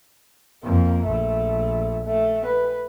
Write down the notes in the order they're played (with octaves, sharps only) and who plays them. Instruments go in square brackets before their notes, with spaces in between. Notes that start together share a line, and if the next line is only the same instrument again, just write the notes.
[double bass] F2 [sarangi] A#3
[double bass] A#1 [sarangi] A3
[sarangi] A3
B4